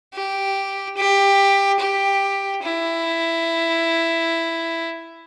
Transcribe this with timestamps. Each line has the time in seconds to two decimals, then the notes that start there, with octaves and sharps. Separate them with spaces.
0.13 G4
0.97 G4
1.79 G4
2.63 E4